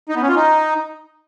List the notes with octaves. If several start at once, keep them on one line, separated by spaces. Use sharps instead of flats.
D#4
B3
C#4
F4
D#4